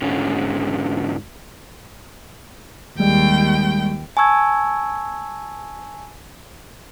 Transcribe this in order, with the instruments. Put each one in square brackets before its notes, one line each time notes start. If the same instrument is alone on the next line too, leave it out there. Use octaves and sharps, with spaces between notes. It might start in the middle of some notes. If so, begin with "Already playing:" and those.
[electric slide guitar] G#2 D3 C#4
[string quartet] D#2 G5 [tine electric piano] G3 G#3
[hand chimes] G#5 A5 C#6 E6 G#6